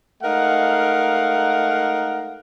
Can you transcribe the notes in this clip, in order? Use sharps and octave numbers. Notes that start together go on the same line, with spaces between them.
G#3 A3 D#4 A#4 F5 F#5